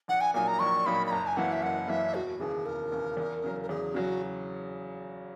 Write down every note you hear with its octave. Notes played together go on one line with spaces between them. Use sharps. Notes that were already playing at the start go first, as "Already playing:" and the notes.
A#1 F#5
G#5
A#2 F#3 A#3 D#4 G#5
A#5
A#1 C#6
A#2 F#3 A#3 D#4 B5
B5
F#1 A#5
G#5
F#2 E3 A#3 E4 F#5
E5
F#1 F#5
F#2 E3 A#3 E4 E5
E1 F#4
D#2 C#3 E3 G#4
E1 A#4
D#2 C#3 E3
E2
C#3 F#3
A#4
E2 G#4
C#3 F#3 F#4